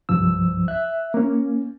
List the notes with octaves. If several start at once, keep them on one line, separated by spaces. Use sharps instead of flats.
C2 G2 F3 E6
E5 F#6
A#3 C#4